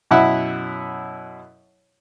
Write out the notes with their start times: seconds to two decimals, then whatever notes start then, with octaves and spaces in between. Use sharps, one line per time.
0.11 F#2 B2 E4 E5 F#5